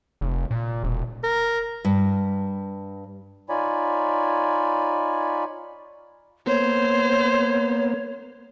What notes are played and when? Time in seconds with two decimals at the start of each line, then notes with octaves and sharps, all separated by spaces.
0.21 F1
0.51 A#2
0.84 E1
1.23 A#4
1.85 G2
3.49 D#4 F4 C#5 D5 G#5 B5
6.47 A#3 B3 C5 C#5